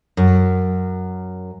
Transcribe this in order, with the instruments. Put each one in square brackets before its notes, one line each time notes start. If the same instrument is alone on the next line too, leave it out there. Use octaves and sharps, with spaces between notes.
[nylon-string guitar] F#2